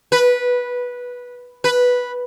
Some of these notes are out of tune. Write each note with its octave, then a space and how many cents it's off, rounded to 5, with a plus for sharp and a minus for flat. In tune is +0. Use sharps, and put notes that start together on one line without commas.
B4 -10
B4 -5